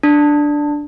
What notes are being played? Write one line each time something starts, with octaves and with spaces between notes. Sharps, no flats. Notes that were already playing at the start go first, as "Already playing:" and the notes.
D4